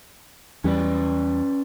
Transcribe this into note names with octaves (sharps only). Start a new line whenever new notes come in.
E2 G3 C#4 B4 D5